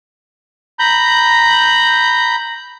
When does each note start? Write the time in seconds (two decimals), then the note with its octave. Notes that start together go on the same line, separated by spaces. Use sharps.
0.79 A#5 B5 G6